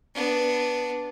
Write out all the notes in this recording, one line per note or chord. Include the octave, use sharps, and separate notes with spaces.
B3 D4